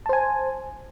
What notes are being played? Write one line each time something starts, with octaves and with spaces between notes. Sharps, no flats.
C5 G#5 A5